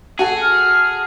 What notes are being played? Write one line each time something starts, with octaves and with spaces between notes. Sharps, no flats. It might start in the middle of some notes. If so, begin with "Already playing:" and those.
F#4 G#4 A4
F6